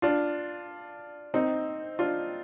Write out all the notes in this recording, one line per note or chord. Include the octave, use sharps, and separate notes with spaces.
D4 F4
C4 D#4
D4 F4